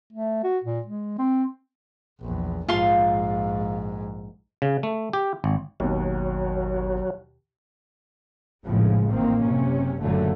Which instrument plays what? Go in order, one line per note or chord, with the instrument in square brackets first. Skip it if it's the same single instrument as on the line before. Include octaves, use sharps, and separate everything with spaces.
[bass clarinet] A3
F#4
A#2
G#3
C4
[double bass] A#1 E2
[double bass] A#1 G#2 [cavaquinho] F4 F5 C6
[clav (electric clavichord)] C#3
A3
G4
G#1
[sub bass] G#1 [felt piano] D#2 B2 [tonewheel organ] F#3
[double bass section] F1 A#1 A2 C#3 F3 G#3
A1 D#3 A#3 C4
F#1 C3 C#4
F#1 F#2 A#2 D3 F#3 A3